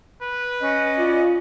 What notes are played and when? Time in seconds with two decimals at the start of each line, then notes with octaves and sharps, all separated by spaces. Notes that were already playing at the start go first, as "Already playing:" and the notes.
0.22 B4
0.60 C#4 D#5
0.98 F4 D5